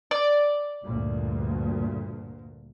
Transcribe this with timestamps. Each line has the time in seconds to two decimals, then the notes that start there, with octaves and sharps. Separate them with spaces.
0.11 D5
0.85 D2 G2 A#2